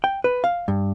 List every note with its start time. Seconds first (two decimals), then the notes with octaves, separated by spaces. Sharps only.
0.04 G5
0.24 B4
0.44 F5
0.68 G2